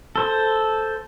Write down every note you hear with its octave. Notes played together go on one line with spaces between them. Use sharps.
A4 C5